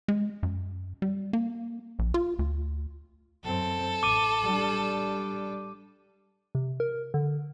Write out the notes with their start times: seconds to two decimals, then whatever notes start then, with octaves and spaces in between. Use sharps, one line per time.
0.08 G#3
0.43 F#2
1.02 G3
1.33 A#3
1.99 A#1
2.14 F4
2.39 D2
3.44 F#2 C4 A4
4.03 A1 D6 D#7
4.43 G3 D4
6.55 C3
6.80 A#4
7.14 D3